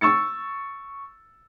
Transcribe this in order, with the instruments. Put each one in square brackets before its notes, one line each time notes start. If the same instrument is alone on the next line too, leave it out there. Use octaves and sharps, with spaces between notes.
[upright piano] C#6 E6 A6 C#7